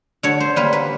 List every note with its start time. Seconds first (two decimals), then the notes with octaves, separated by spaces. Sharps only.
0.23 D3 C#5
0.40 C5
0.56 G3 A#3 B4
0.73 B4